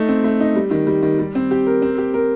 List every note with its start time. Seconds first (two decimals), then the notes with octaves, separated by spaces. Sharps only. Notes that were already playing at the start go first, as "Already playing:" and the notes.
Already playing: A3 D#4
0.09 C4
0.24 A3
0.40 D#4
0.56 G3
0.71 D#3
0.87 G3
1.02 D#3
1.19 G3
1.35 C4
1.51 G4
1.67 A#4
1.82 C4
1.98 G4
2.14 A#4